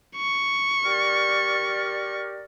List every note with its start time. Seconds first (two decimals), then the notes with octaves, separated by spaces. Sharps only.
0.16 C#6
0.84 G4 A#4 D5